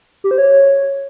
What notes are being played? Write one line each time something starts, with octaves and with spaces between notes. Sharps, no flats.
G4
C5
C#5